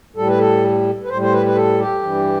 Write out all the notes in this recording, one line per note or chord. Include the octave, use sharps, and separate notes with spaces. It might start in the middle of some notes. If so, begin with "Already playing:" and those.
A2 G3 A4
B4
A4
B4
A2 G3 C5
C5
B4
B4
A4
G4
G2 E3 G3